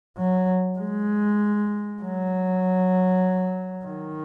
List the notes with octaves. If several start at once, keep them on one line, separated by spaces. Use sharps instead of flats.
F#3
G#3
F#3
D#3